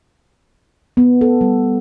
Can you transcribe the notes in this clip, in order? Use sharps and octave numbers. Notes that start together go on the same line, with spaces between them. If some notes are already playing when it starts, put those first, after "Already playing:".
B3
A4
G3